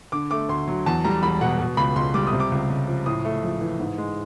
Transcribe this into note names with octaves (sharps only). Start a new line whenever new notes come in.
D3 D6
A3 D6
D2 C6
F#3
E2 A5
G3 A#5
E1 B5
B2 F#5
B2
C#2 B5
C#2 C6
G3 D6
D#6
C3
D6
C#2
C#2
F3
A2 D#6
A3
A#1
E3
G#2
G#3